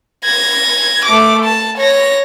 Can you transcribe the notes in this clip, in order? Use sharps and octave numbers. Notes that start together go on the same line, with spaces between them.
G#6 A#6
A3 D6
A5
C#5 A#6